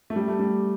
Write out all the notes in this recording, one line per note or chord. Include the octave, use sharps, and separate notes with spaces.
A3
G3
A3
G3